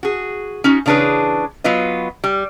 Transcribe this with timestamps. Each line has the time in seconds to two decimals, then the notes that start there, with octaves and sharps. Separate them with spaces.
0.03 F#4 G#4
0.64 C#4 D#4 F#4
0.86 C#3 E3 D4 G#4 B4 C#5
1.64 F#3 B3 F4 B4 D#5
2.24 G3